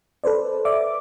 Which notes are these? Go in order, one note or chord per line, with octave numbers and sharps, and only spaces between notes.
A4 B4 C5 D5
D5 E5 D6